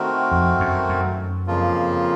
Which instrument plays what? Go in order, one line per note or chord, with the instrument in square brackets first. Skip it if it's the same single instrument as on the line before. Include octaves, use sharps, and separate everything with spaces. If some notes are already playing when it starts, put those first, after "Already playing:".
Already playing: [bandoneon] D#3 A3 C4 F#4 A#4
[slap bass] F2
F#2
F#2
[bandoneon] F2 C#3 F3 A#3 F4